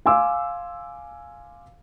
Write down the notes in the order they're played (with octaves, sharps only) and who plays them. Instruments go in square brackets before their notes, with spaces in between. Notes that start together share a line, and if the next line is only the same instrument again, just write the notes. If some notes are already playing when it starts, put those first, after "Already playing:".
[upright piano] F5 G#5 C6 D6 E6